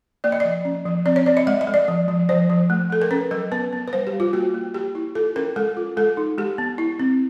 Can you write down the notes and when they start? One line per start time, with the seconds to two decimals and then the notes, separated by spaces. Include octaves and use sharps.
0.24 A#3 D5
0.32 D#5
0.40 F3 D5
0.65 C#4
0.86 F3
1.06 C4 D5
1.16 C#5
1.26 C4 D5
1.37 D#5
1.47 G#3 E5
1.61 D#5
1.67 G#3
1.74 D5
1.88 F3
2.08 F3
2.29 F3 C5
2.50 F3
2.70 A3
2.90 A3 A4
3.02 A#4
3.11 C#4 B4
3.31 F#3 A#4
3.52 B3 B4
3.73 B3
3.88 B4
3.93 G3 C5
4.07 G4
4.13 G3
4.20 F4
4.33 A#3 F#4
4.54 A#3
4.74 A#3 G4
4.95 E4
5.15 F4 A4
5.36 C#4 A#4
5.56 G#3 A4
5.77 F4
5.97 G#3 A4
6.17 D#4
6.38 G#3 G4
6.58 B3
6.78 E4
6.99 C4